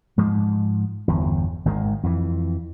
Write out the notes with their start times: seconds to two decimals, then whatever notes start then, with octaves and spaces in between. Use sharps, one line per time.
0.18 G#2 F3 G#3
1.08 G1 E2
1.65 G#1 D#3 G#3
2.03 F2 E3